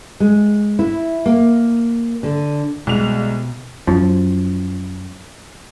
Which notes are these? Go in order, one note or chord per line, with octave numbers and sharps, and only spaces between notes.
G#3
E4
A#3
D3
C2 B2 G#3 F7
F#2 F3